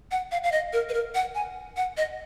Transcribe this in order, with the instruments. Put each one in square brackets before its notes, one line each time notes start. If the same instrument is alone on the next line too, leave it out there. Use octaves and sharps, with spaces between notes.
[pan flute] F#5
F5
F5
D#5
A#4
B4
A#4
F#5
G#5
F#5
D#5